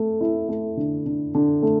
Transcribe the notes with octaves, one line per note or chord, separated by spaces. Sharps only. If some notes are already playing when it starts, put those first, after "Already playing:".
Already playing: A3
E4
A3
D3
D3
D3
A3